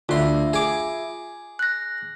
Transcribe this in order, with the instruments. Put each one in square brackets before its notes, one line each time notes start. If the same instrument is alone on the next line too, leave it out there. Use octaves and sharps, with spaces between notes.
[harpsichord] D2 C6 [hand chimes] F4 E5
[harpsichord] G#4 D6
[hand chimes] F#6 A#6